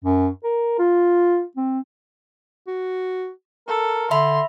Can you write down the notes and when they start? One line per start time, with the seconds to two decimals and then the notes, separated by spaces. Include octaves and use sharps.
0.04 F#2
0.44 A#4
0.79 F4
1.57 C4
2.67 F#4
3.68 A4 A#4
4.11 D3 E5 B5 C6